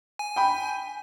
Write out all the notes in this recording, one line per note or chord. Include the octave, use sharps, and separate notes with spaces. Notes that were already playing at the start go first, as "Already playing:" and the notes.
G#5
G5 B5